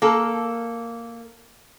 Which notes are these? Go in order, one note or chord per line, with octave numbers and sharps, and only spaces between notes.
A#3 A4